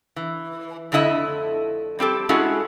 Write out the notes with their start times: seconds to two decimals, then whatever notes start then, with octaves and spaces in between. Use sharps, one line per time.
0.16 E3
0.92 F2 D3 A3 E4 D#5 E5
1.99 G3 C4 G4 A4
2.29 G#3 C#4 E4 F#4 G#4 A4